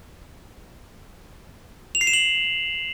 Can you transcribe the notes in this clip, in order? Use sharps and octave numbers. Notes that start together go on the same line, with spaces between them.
F7
C7
E7
F#7